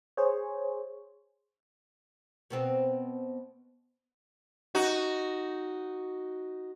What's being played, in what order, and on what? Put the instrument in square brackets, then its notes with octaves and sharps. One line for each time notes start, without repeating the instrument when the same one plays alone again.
[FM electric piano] G#4 C5 C#5
[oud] B2 B3 C4
[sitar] D#4 F#4